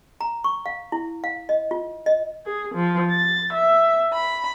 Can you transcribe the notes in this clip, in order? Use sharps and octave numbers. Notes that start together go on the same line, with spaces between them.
A#5
C#6
F5
E4
F5
D#5
F4
D#5
G#4
F3
A6
E5
B5